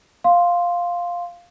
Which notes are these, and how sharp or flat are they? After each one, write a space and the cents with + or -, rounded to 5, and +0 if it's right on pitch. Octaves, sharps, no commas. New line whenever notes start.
F5 +0 C6 +0